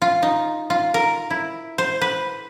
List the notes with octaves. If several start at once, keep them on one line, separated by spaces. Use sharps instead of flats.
F4
D#4
F4
A#4
E4
C5
B4